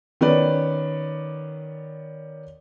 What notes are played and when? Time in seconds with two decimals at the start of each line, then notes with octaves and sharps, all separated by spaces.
0.21 D#3 B3 C#4 B4 D5